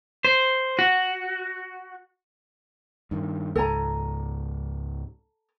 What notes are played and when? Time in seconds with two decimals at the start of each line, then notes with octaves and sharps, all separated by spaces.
0.25 C5
0.79 F#4
3.11 G2 D#3
3.56 C#2 G#2 A4 G#5 A#5